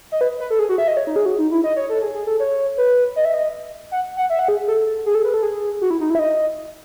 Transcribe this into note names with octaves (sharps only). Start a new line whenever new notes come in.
D#5
B4
B4
A4
G#4
F#4
E5
D#5
C#5
D#4
G#4
F#4
D#4
E4
D#5
C#5
A4
G#4
G#4
A4
C#5
B4
D#5
E5
D#5
F#5
F#5
E5
F#5
G#4
A4
G#4
A4
B4
A4
G#4
F#4
E4
D#4
E4
E5
D#5